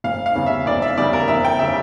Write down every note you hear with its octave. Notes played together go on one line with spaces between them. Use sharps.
F1 F5
F5
E2 C#3 G3
E5
F1 D5
E5
E2 C#3 G3 D5
A#4
F1 E5
G5
C#3 G3 E5